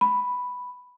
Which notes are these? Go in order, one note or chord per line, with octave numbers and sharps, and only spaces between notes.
B5